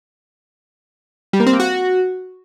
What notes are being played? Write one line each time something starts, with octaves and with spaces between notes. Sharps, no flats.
G3
A#3
C4
A#3
F#4